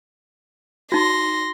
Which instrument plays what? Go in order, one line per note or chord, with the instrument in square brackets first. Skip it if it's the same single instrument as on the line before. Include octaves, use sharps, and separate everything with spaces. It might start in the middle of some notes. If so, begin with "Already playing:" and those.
[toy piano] D#4 F#4 [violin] C6 A#6